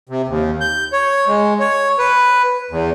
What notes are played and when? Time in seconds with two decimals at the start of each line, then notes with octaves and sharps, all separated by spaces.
0.09 C3
0.28 D#2
0.61 G6
0.92 C#5
1.27 G#3
1.60 C#5
1.99 B4
2.71 E2